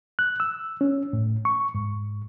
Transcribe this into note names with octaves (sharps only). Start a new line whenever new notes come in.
F#6
E6
C#4
A2
C#6
G#2